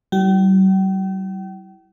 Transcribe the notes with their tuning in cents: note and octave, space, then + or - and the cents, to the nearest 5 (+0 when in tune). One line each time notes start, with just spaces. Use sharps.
G3 -45 E4 +0 G5 -40